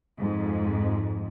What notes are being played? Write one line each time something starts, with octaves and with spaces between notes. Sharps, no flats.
F2 G#2